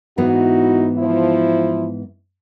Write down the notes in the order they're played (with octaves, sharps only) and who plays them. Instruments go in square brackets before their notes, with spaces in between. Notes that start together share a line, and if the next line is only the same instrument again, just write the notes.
[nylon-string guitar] G#2 E3 B3 [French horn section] D#4 E4 F#4
[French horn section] F3 E4